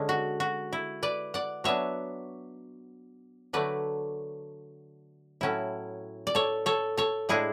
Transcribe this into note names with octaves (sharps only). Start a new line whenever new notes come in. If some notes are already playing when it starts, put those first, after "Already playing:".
Already playing: D3 G#3 C#4
F#4
F#4
E4
B4 D5
D5 F#5
F#3 B3 D4 C#5 E5
D3 F#3 A3 B4 D5
A2 F#3 C#4 E4
D5
A4 C#5
A4 C#5
A4 C#5
A2 G#3 D4 E4 G#4